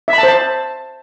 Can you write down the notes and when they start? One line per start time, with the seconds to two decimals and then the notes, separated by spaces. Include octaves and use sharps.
0.08 E5
0.13 B5
0.18 A5
0.23 C5
0.28 A5